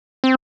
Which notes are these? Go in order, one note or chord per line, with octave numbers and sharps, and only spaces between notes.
C4